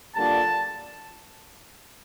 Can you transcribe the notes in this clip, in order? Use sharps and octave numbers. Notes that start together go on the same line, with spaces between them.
D3 G3 A#3 D4 F4 A5